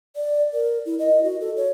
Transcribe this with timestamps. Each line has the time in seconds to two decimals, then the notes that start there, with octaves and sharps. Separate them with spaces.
0.16 D5
0.53 A#4
0.86 E4
0.99 D#5
1.23 F#4
1.41 A4
1.57 C#5